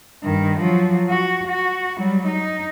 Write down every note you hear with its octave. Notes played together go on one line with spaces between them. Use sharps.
G2 D#3
F3 F#3
F#4
F#4
F#3 G3
D#4